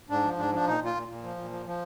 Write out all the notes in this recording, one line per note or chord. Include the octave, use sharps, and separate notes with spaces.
G#2 D4
F3
G#2 D4
F3 D4
A#2 D#4
A#2 F4
A#2
A#2
F3
A#2
F3
F3